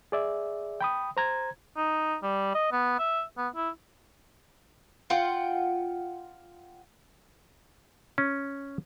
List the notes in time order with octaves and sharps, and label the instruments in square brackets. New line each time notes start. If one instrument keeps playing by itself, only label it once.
[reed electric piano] G#4 D5 E5
G5 B5 D#6
C5 A#5 G#6
[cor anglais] D#4
G3
D#5
B3
E5
B3
E4
[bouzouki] F4 F#5 G5
[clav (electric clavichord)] C#4